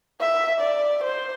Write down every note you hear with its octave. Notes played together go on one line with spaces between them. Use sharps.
E5
D5
C5